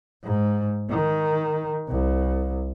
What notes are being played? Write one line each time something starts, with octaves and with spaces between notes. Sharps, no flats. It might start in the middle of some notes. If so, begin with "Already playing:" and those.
G#2
D#3
C2